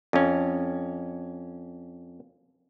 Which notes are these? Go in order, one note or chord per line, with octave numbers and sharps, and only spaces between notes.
F2 C#4